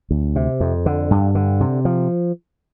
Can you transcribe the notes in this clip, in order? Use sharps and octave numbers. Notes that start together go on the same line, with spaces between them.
D2
C3
F2
D3
G2
D3
C3
F3